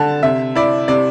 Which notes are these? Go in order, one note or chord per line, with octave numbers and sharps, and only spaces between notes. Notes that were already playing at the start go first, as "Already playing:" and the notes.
Already playing: D3 A5
C3 E5
E4 D5
C3 D5